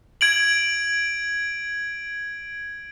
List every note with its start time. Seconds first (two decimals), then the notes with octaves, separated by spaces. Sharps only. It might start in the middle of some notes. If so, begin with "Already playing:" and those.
0.21 G#6 D7 F#7